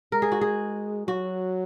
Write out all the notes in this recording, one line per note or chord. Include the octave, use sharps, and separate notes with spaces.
G#3 A#4
G#4
F#4
G#4
F#3 F#4